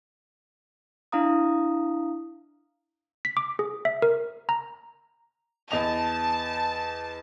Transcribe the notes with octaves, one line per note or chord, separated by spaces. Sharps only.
D4 E4 F5 A#5 D#6
B6
D6
G#4
E5
A#4
A#5
E2 D#5 A5 F7